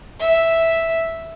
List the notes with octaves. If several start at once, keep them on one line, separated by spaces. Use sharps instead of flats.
E5